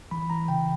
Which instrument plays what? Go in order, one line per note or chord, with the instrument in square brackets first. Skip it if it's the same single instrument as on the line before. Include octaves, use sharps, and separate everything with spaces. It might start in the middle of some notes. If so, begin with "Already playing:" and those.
[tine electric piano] E3 B5
E3 A#5
C#3 G5